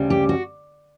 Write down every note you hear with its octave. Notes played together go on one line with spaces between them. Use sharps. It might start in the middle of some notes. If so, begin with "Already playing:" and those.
Already playing: D2 C#3 G3
G4
F#4